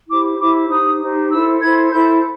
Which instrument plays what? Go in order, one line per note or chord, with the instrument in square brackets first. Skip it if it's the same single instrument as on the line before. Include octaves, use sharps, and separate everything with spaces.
[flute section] E4 G4 C5 D6
E4 G4 C5 D6
D#4 G4 C5 D#6
D#4 G4 C5
E4 A4 C5 E6
E4 A4 C5 G#6
E4 A4 C5 G6